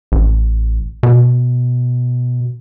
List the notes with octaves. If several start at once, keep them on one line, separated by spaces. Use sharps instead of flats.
A1
B2